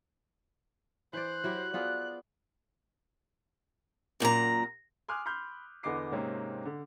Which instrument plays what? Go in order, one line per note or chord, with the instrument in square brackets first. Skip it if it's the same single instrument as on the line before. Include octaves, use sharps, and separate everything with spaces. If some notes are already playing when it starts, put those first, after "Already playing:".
[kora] E3 D5 [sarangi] C5 [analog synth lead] F#6
[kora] F#3 E4 G4
[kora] B3 F4 G#4 [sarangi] D5
[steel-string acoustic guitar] F#2 A#2 A5 A#5
[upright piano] G#5 C6 D6 D#6 F6 F#6
B5 C6 F6 G6
E2 D3 B3 D#5 D6 C7
G#2 C3 A#3 C4 C#4
D3